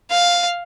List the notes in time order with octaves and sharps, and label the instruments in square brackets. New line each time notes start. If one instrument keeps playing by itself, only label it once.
[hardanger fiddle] F5